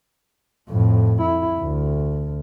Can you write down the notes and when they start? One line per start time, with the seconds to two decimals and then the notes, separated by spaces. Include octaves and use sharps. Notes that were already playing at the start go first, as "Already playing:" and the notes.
0.69 F2 A2
1.21 E4
1.60 D2